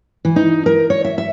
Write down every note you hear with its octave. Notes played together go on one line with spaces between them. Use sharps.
E3
D#4
A#4
C#5
E5
E5